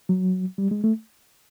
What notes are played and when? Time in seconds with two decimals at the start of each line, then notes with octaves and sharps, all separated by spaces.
0.09 F#3
0.58 G3
0.71 G#3
0.84 A3